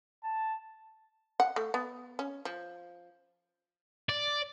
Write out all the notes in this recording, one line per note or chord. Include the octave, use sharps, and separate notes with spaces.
A5
F#5
A3
B3
C#4
F3
D5